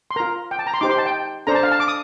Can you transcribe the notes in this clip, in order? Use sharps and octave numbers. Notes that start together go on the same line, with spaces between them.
C6
F4 A#4 A#5
G5
A5
A#5
C6
D#4 G4 C5 D6
C6
A5
G5
D4 A4 C5 A#5
A5
F5
A5
D6
D#6